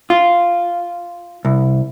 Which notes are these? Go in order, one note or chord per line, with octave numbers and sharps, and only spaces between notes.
F4
C2